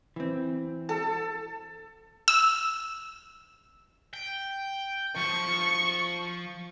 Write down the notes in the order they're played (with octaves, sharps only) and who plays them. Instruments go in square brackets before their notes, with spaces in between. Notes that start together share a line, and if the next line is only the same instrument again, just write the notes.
[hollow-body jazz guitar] E3 C4
[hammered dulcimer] A4
[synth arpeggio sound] E6
[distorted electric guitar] G5
[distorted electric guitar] F3 [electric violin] C#6